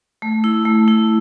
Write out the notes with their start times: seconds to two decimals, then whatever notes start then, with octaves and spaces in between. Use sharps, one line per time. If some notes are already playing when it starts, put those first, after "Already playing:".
0.22 A3
0.44 E4
0.65 A3
0.88 E4